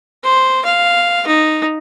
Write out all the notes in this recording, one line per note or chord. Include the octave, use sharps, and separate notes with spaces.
C5
F5
D#4